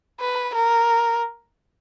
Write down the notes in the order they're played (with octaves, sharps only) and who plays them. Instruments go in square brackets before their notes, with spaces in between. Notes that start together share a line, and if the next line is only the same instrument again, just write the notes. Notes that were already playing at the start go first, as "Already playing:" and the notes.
[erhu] B4
A#4